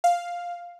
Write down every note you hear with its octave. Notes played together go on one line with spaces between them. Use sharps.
F5